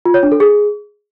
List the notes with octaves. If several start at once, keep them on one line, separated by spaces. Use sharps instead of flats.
F4
C#5
D4
A4
G#4